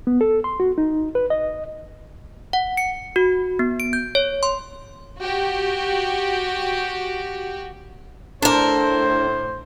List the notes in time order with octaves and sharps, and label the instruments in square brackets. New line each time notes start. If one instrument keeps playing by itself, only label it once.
[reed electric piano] B3
A4
C6
F#4
D#4
B4
D#5
[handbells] F#5
C#7
F#4
B3
D7
G6
C#5
C6
[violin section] F#4 G4
[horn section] A2 C5 [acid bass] D4 [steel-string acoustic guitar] A4 A#4